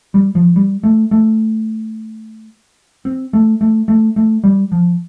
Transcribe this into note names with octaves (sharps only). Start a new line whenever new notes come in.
G3
F3
G3
A3
A3
C4
A3
A3
A3
A3
G3
F3